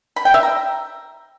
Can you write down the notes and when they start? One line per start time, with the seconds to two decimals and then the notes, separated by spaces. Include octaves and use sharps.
0.16 B5
0.25 G5
0.34 E5
0.43 A#5